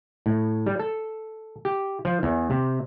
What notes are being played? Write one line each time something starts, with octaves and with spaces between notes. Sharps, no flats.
A2
G3
A4
G4
F3
E2
C3